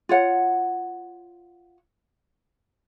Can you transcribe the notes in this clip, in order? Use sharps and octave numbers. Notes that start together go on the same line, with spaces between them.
F4 C#5 F#5